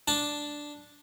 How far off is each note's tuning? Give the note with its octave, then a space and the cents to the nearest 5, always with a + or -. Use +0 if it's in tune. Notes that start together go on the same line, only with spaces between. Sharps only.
D4 +0 A5 +0